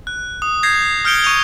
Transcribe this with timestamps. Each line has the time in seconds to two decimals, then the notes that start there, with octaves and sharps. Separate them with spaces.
0.07 F#6
0.42 D#6
0.63 G6 G#6 A#6 C7
1.04 D#6 F6 G6 C#7 D7 G7
1.24 C#6 D#6 F7